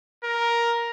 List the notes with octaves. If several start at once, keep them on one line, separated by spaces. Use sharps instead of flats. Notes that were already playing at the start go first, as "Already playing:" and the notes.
A#4